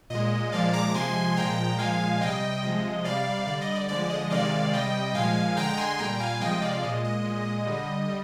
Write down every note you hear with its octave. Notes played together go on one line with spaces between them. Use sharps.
A#2 G#3 D#5
A#2 F3 G#3 D5 F5
A#5 D6
C3 F3 G#3 G#5 C6
A#2 F3 G#3 G5 A#5
A#2 F3 G#3 F5 G#5
C3 G3 D#5 G5
C3 F3 G#3 D#5
C3 G3 D5 F5
D3 G3 D5
D#5
D5
D3 F3 G#3 D5
D#5
C3 D#3 G#3 D5 F5
C3 G3 D#5 G5
A#2 F3 G#3 F5 G#5
D3 G#3 G5 A#5
G#5 C6
A#2 G3 G5 A#5
F5 G#5
C3 F3 G#3 D#5 G5
D5 F5
A#2 G#3 D#5
D#5
A#2 G#3
D3 G3
G3